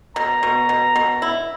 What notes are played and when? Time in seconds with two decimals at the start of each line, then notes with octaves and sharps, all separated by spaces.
0.16 B2 A#5
0.43 B2
0.69 B2
0.96 B2
1.22 E4